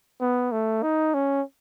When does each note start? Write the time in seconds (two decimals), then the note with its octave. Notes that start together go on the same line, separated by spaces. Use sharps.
0.21 B3
0.52 A3
0.82 D#4
1.14 C#4